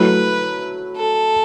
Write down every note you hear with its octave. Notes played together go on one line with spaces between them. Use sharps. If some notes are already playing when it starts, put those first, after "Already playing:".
Already playing: F#3 A3 E4 B4
A4